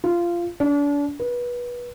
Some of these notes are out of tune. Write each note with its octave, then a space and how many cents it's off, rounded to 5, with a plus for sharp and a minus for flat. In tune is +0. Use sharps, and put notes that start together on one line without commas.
F4 -15
D4 -35
B4 -25